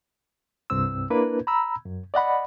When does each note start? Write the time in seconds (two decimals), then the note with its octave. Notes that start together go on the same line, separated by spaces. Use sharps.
0.70 C2 G2 C4 E6
1.10 A#3 D4 E4 A#4 B4
1.47 A#5 B5 E6
1.85 F#2
2.14 D5 D#5 F#5 B5